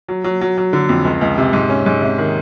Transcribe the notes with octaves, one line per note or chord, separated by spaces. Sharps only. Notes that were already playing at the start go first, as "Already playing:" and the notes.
F#3
F#3
F#3
F#3
D3
F2
C#2
C#2
C3
G#2
C#4
G#2
C3
D#3